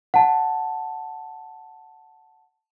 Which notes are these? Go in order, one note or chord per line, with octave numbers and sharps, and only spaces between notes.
F#5 A5